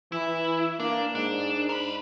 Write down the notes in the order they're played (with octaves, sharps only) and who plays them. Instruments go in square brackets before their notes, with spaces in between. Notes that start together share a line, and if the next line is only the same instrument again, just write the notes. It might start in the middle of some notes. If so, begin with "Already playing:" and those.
[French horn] E3 [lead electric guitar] E4
[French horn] A#3 [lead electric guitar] D4
[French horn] G#2 [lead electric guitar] D4
[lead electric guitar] A#4 B5